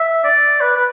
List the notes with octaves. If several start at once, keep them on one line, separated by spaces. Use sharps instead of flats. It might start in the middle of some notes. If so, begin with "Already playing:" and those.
Already playing: E5
D5
B4
B4